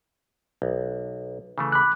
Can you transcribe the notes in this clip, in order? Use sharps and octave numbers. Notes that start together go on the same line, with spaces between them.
B1
C#3 E3 A3
B5 D6 F#6